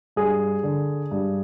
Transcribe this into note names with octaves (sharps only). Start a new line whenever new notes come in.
G2 G#4
D3
G2